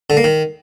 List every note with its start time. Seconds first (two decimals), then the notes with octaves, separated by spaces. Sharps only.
0.10 D3
0.17 A#3
0.24 D#3